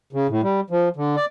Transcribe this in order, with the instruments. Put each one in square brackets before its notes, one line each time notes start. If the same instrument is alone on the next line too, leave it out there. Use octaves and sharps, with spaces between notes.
[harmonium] C#3
A2
G3
F3
D3
D5